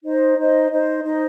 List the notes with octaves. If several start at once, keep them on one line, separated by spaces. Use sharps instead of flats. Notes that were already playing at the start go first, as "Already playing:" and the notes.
D#4 C5 D#5
D#4 C5 D#5
D#4 C5 D#5
D#4 C5 D#5